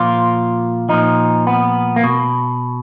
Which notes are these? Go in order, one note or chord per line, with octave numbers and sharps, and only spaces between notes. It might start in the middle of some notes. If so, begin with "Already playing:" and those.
Already playing: A#2 F3 F4
A#2 F3 D#4
B3
A#3
B2